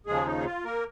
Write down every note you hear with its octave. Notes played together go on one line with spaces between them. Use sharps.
D#2 C#3 F3 G#3 G#4
D#4
G#4
F4
A#3 A#4